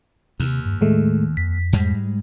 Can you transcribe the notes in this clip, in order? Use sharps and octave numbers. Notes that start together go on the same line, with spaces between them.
D#2 C3
G2
A2 D#3 G#3 A3
F2 B6
G#2 G3 G#3